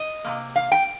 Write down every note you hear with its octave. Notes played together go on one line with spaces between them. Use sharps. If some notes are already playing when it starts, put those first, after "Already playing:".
Already playing: D#5
C3 D#3 A#3
F5
G5